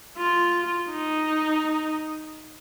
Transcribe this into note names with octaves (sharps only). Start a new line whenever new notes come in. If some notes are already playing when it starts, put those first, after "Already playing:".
F4
D#4